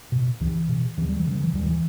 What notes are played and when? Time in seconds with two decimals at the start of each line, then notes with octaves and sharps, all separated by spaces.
0.12 B2
0.40 C#2 E3
0.68 B2
0.97 D#2 E3
1.09 G3
1.20 E3
1.26 C#3
1.31 G3
1.43 E3
1.53 D#2 G3
1.66 E3